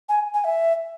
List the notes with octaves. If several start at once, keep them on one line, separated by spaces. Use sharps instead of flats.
G#5
G#5
E5